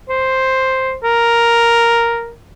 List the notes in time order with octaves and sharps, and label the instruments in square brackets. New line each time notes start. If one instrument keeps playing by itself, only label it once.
[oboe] C5
A#4